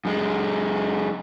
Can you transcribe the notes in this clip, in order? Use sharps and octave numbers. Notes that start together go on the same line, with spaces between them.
F#2 G#3